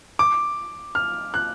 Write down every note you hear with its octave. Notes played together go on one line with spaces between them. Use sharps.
D6
F6
F#6